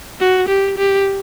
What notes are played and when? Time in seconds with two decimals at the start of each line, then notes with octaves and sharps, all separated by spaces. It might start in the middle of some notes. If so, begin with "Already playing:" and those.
0.20 F#4
0.48 G4
0.78 G4